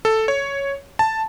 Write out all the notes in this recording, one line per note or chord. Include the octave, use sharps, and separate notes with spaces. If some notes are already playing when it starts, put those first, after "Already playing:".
A4
C#5
A5